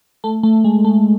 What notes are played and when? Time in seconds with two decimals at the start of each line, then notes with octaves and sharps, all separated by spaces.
0.24 A3
0.43 A3
0.64 G#3
0.85 A3